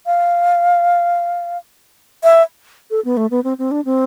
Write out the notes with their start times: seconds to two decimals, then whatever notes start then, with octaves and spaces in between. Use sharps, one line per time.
0.06 F5
2.24 E5
2.91 A4
3.05 B3
3.17 A3
3.31 B3
3.44 C4
3.59 C4
3.71 D4
3.85 C4